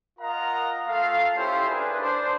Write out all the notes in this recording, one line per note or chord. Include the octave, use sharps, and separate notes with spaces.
F4 A#4 D#5 F5 F#5 A#5
A3 F4 A4 F5
C#4 E4 F4 G4 A4 C5
D4 G#4 A#4 B4
D4 C5